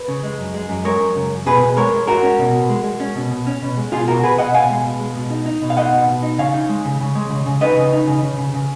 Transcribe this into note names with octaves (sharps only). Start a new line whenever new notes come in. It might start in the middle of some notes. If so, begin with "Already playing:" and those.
Already playing: B4
C#3
G#3
F#2
G#3
F#2
G#3 A#4 C#5
F#2
C#3
F#2
B2 G#4 B4
B2
G#3 A#4 C#5
G#3
G#3 F#4 A#4
C#4
B2
B2
G#3
G#3
C#4
B2
B2
C#4
B2
G#3
B2 F4 G#4
B2 F#4 A#4
B2 G#4 B4
B2 D#5 F#5
B2 F5 G#5
G#3
B2
G#3
B2
D#4
D#4
B2
F5
D#4 D#5 F#5
B2
B2
D#4
C#3 C#5 F5
D#4
G#3
C#3
C#3
G#3
C#3
C#3
D#4 B4 D#5
C#3
D#4
C#3
C#3
C#3
C#3